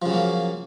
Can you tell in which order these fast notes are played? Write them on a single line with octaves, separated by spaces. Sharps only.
F3 C#3 F#3 A#3